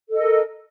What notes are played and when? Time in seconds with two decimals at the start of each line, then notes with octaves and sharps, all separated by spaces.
0.09 A4
0.13 D#5
0.17 A#4